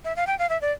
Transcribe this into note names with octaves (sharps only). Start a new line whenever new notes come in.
E5
F5
G5
F5
E5
D5